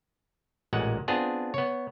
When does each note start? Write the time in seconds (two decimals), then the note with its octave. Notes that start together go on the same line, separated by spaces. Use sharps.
0.73 A1 A#2 G#3 F#5
1.08 B3 C4 D4 F4 G#4
1.54 B3 C#5